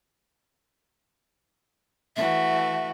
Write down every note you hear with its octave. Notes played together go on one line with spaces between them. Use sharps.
E3 A3 F#4 E5